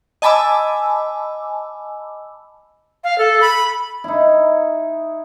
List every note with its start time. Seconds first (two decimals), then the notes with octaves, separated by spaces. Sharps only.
0.22 D#5 G#5 A5 B5 D6 E6
3.04 F5
3.18 A4
3.41 B5
4.04 D#4 E4